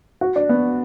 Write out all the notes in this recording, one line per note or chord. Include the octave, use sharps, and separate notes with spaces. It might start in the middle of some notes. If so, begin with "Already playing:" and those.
F#4
D4
B3